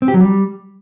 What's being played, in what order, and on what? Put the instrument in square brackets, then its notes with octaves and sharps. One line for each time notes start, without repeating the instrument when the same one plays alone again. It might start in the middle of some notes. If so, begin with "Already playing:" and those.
[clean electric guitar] C4
G4
F#3
G3